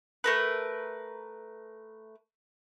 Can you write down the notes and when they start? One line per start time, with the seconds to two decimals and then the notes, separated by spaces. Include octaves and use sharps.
0.24 A3 A#4 B4